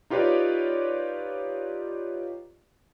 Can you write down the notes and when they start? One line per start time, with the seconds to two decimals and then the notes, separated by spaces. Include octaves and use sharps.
0.10 D#4 F4 G4 B4 C#5 D5